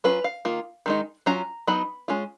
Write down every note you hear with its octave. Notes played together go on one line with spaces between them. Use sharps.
F#3 C#4 F4 B4
F5
D#3 A#3 F4
D#3 G#3 D#4
F#3 C#4 F4 A#5
F#3 B3 D#4 B5
G#3 C#4 F4